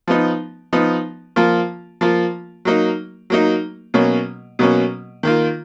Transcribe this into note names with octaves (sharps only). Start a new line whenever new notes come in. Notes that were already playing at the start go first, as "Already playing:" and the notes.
F3 B3 D#4
F3 B3 D#4
F3 A#3 F4
F3 A#3 F4
F#3 A#3 D#4
F#3 A#3 D#4
B2 F#3 A#3 C#4
B2 F#3 A#3 C#4
D#3 A#3 F4